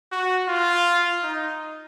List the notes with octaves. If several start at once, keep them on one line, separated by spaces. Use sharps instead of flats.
F#4
F4
D#4